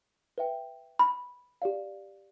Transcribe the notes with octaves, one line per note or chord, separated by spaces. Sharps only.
B4 E5 G5
B5
G4 D5 F5